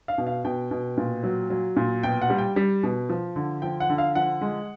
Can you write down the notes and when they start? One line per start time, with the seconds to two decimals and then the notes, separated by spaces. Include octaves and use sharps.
0.08 F5
0.18 B2
0.27 F5
0.45 B2 G5
0.71 B2
0.97 A#2
1.23 F#3
1.50 F#3
1.76 A#2
2.03 B2 G5
2.22 F#5
2.30 G3
2.38 G5
2.56 G3
2.83 B2
3.09 F3
3.36 D3
3.62 F3 G5
3.80 F#5
3.89 D3
3.98 F5
4.15 F3 F#5
4.41 G#3